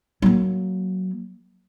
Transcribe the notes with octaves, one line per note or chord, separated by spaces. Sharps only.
F#3 A#3